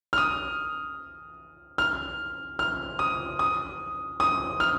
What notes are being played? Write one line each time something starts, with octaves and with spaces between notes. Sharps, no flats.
F6
D#6
F6
F6
D#6
D#6
D#6
F6